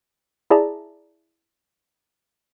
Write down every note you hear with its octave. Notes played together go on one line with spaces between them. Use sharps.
E4 G#4 D5 E5 A5 A#5